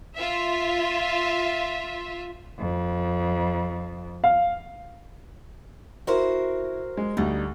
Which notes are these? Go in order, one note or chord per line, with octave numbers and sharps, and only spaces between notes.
F4 E5
F2
F5
E4 F#4 A#4 C5
G#3
D2 G3 D#4